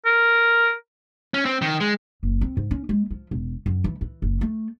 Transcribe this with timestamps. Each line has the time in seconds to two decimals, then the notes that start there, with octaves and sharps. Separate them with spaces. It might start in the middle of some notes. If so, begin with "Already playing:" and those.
0.05 A#4
1.34 C#4
1.45 C4
1.62 D#3
1.80 G#3
2.23 F#1
2.41 C4
2.57 G#2
2.71 C#4
2.89 G#3
3.11 F3
3.31 E1
3.66 F#2
3.84 E3
4.01 E3
4.22 F#1
4.41 A3